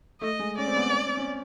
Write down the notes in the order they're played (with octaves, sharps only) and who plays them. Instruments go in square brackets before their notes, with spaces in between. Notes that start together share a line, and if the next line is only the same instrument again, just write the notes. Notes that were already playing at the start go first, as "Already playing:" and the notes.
[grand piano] A3 [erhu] D#5
[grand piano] G#3
[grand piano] C#4 [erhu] D5
[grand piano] C4
B3
C#4
C4
C#4